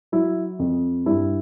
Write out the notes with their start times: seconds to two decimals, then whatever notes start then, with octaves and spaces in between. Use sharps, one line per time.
0.12 F#3 E4
0.59 F2
1.06 G2 E4